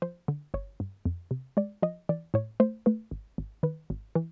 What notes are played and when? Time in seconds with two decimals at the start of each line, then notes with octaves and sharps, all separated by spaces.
0.02 F3 C5
0.28 D3
0.54 G1 C#5
0.80 G2
1.05 F2
1.31 C3
1.57 G#3 D5
1.83 F3 D#5
2.09 E3 D5
2.34 A2 C#5
2.60 A3 C5
2.86 A3 B4
3.11 G#1
3.38 G#1
3.63 D#3 B4
3.90 G#1
4.15 E3